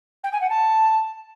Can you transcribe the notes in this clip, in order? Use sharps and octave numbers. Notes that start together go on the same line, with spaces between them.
G5
G#5
F#5
A5